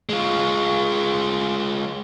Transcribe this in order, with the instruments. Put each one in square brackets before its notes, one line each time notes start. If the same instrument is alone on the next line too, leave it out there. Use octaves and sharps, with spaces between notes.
[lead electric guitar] G#3 F4